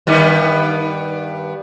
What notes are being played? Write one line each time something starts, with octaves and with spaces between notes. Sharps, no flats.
G2 D#3 B3